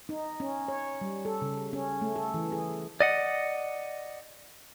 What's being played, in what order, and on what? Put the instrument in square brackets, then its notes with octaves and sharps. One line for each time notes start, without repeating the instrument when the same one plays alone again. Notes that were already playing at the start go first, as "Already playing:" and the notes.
[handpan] D#4
C#4
C#5
G3
A4
C#3
C#4
A3
A4
E3
G#4
[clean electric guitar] D5 D#5 F#5